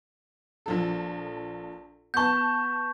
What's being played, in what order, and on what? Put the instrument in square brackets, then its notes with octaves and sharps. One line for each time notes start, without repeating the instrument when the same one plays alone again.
[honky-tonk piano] A#1 F3 A4
[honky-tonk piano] B3 A5 [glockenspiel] C#6 G6